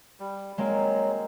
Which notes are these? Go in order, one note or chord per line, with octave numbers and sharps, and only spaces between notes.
G3
F#3 G#3 A#3 C4